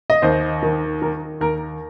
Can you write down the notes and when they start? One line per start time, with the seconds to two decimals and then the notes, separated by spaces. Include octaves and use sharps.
0.10 D#5
0.22 D#2 C5
0.63 D#3
1.02 D#3 A#4
1.41 D#2 A#4